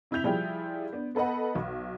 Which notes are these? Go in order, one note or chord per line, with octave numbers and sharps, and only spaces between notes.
C3 E4 E5 G6 F7
F3 G3 E4 G#4 G5
B3 D4
B3 A4 B4 D#5 F#5
B1